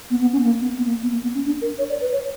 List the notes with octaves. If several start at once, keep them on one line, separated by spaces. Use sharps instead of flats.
B3
B3
C#4
B3
A#3
B3
B3
A#3
B3
A#3
B3
C#4
D4
A#4
C#5
D5
B4
C#5